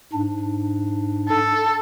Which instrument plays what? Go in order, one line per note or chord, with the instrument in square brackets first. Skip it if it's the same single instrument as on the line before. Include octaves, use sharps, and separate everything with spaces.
[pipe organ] G#2 D4
[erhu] A4